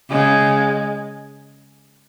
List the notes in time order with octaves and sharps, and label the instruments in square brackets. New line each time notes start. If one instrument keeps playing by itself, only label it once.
[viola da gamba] C#3 [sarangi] G#3